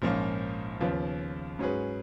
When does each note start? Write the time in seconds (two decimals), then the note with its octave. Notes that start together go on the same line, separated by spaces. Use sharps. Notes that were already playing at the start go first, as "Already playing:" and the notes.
0.02 A#1 G#2 F3 A#3 C#4
0.81 D#2 C#3 F3 B3 F4
1.59 G#2 F#3 C#4 G#4 B4